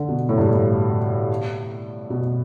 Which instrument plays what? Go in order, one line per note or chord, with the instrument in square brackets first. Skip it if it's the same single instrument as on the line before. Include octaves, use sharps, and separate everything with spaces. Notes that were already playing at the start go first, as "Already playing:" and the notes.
Already playing: [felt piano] D3
B2
A2
G2
A2
B2